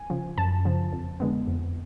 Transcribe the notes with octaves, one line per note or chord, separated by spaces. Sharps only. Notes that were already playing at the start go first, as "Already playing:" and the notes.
Already playing: G#5
C#3 F3
F#2 A5
C#3 F3
F2
D3 G#3 B3
F2